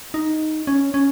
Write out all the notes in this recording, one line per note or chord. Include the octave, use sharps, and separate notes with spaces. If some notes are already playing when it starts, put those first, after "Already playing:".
D#4
C#4
C#4